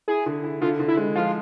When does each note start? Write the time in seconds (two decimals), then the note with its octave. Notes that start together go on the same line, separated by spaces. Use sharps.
0.08 E4 G#4
0.26 D3
0.44 E4
0.61 D3 F4
0.80 D3
0.88 E4
0.97 G#3
1.15 F3 F4